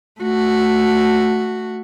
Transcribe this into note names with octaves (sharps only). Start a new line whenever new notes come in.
A3 F#4